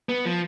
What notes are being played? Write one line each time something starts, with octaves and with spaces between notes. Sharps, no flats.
B3
F3